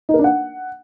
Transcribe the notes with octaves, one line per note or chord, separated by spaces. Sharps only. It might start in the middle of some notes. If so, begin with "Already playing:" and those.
D#4
A#4
D4
F#5